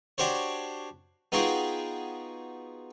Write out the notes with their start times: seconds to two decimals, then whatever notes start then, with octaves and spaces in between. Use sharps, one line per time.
0.18 D4 F#4 G4 C5 C#5
1.32 B3 D#4 F4 F#4 G#4 G5